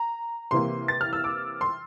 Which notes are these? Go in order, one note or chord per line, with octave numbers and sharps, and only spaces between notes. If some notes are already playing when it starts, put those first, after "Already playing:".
Already playing: A#5
C3 E3 A#3 C6
A6
F6
E6
D6
C6